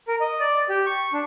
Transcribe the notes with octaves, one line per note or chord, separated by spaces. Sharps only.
A#4
D#5
D5
G4
C#6
D4